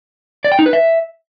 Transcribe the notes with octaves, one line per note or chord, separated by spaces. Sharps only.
D5
G5
D#4
B4
E5